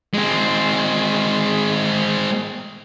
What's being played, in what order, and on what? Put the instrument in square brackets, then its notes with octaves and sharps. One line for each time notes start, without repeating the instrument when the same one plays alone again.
[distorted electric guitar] G#3 C4